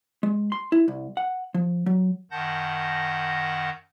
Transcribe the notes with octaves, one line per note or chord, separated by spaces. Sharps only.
G#3
C6
E4
C2
F#5
F3
F#3
F#2 D#3 F#5 A5 G6 A#6